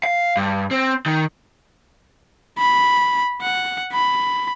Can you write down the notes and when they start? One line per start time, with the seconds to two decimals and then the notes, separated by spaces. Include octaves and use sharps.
0.04 F5
0.37 G2
0.71 C4
1.06 D#3
2.58 B5
3.42 F#5
3.92 B5